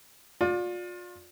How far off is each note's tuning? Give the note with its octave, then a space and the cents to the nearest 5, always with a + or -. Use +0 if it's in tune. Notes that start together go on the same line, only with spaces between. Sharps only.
F4 +35 D5 +0